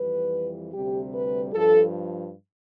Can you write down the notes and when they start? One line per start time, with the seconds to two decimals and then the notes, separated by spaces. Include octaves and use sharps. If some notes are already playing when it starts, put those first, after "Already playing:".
Already playing: F2 E3 G3 B4
0.72 D2 C3 G3 G4
1.13 B4
1.52 G2 F3 A4